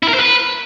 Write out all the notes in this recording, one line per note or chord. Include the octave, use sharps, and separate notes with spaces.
E4
A#4
C5
B4